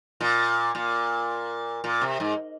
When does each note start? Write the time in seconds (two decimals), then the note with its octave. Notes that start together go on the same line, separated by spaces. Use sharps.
0.21 A#2
0.75 A#2
1.84 A#2
2.01 C3
2.20 G#2